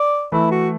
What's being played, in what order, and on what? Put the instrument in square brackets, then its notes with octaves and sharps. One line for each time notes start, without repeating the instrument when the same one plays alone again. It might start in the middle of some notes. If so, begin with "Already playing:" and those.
Already playing: [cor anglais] D5
[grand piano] E3 A3 [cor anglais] E4
[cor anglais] F#4